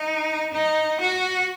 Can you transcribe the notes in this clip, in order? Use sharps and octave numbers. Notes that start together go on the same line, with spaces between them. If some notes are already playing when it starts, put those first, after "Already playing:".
Already playing: D#4
D#4
F#4